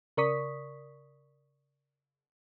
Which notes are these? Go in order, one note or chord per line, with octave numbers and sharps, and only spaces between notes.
C#3 A#4 D5 C#6 D#6 B6